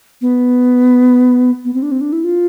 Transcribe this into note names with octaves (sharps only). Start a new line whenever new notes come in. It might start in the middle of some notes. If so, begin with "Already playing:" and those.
B3
B3
C4
D4
C4
D4
E4
F4